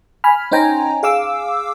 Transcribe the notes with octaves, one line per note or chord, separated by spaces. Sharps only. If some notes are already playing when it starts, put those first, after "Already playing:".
G#5 B5 F6
C#4 D#4 C5 G5 G#5 A#5
G#4 F5 D6 E6